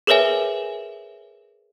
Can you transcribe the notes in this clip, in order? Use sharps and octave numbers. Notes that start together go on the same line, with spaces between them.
G#4 A#4 B4 C#5 E5 G#5